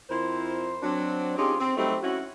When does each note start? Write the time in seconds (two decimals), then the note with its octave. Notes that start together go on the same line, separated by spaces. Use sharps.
0.09 F2 E4 A#4 C5
0.83 F#3 C4 D4
1.37 C4 C#4 D#4 F4 G4 G#4
1.59 C4
1.77 F#3 G3 A3 C4 D#4 G4
2.02 C4 C#4 E4 F#4